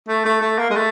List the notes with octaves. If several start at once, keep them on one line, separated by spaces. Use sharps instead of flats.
A3
A3
A3
A#3
G#3
A3